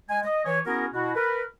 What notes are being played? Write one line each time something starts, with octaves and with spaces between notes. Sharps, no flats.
G#3 G#5
D#5
E3 C#5
B3 C#4 E4 F#4 G#4 A#4
B2 E4 F#4
A#4 B4